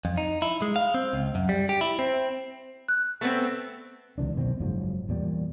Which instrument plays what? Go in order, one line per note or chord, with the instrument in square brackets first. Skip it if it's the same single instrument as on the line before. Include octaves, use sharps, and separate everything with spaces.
[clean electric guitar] F2
D#4
E4
G#3
F5
C4
C#2
F#2
G3
G4
E4
C4
[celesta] F#6
[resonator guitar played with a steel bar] A3 B3 C4
[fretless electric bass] C#2 C3 E3 D4
F#2 B2 D#3 C4
F#1 G#2 F3 F#3
E2 A#2 G3